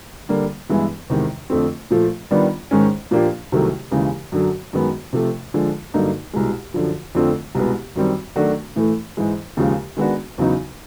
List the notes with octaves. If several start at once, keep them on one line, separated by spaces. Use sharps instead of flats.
D3 G3 A#3
G2 E3 G#3 B3 E4
E2 C3 D#3 G#3
F2 D3 F3 A3 C4
A#2 F3 A3
D#3 G3 B3 D4 F4
G#2 D#3 G#3 C#4
A#2 F3 A#3 D4 G4
C2 C3 D#3 F#3 A3
D#2 C#3 E3 G#3
F#2 D3 F#3
F#2 D#3 G#3 B3
C3 F3 A3
D3 F3 G#3
G2 D3 F#3 A#3 D#4
C2 B2 G#3
F#2 D3 F3
F2 D3 F3 A3 C4
C2 B2 G#3 B3
F#2 D#3 G3 C4
D#3 F#3 A3 D4 F#4
A2 E3 A3
G#2 E3 G#3
D#2 C#3 F3 G#3
D#3 G#3 B3 D4 F#4
E2 C#3 F#3 B3 D#4